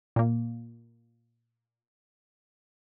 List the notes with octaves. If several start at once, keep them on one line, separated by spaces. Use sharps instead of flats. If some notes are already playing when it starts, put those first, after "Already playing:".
A#2 A#3